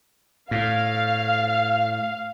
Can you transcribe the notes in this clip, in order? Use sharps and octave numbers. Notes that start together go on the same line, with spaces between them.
A2 F5